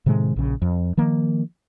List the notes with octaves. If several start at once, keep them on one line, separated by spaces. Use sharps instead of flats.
A2 C3 D#3 G#3
A#1 C#3
F2
D#3 F3 A#3